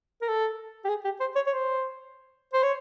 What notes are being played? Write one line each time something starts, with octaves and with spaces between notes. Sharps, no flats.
A#4
A4
G4
G#4
G4
C5
C#5
C#5
C5
C5
C#5